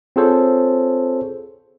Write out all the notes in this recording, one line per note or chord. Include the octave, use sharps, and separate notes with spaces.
C4 F4 G#4 A4 C5 C#5